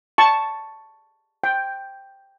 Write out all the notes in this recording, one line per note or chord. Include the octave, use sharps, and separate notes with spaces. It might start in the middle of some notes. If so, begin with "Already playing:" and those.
A5 C#6
G5